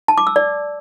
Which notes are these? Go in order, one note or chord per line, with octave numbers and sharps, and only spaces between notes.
A5
D6
E6
D5